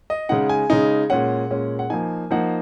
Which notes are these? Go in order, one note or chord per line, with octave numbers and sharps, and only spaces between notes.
D#5
C#3 G#3 D#4 F#5
G#5
C#3 G#3 D#4
A#2 G#3 C#4 F#5
A#2 G#3 C#4
F#5
F3 A#3 D#4 G#5
F3 A#3 D#4 F#5